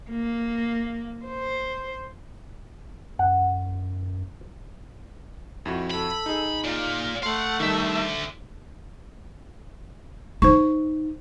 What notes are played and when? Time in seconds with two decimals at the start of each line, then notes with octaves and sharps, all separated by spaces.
0.10 A#3
1.26 C5
3.19 F#2 F#5
5.66 F2 E4 F#4
5.91 A4 B5
6.26 D#4 G#4
6.64 A#2 F4
7.23 A3 F5 F#5 C6
7.60 D3 D#3 G3 E5
10.42 D#4 C5 C#6